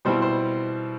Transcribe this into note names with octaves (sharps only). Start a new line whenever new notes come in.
B2 G3 C4 E4 C5
C5